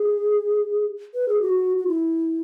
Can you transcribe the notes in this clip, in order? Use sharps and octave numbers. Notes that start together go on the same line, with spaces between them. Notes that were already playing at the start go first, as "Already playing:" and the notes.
Already playing: G#4
B4
G#4
F#4
F#4
E4